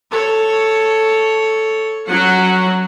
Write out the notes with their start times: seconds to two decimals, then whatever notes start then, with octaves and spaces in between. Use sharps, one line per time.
0.11 A4 C#5
2.06 F#3 C#4 F#5